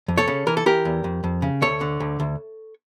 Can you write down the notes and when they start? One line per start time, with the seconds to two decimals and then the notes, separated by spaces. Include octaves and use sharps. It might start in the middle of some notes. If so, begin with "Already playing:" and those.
0.08 F2
0.18 A4 C#5
0.28 C#3
0.47 E3 A#4
0.57 A4
0.66 E3 G4 A#4
0.85 E2
1.04 F2
1.24 F2
1.42 C#3
1.62 D2 A4 C#5
1.81 D3
2.00 D2
2.20 D2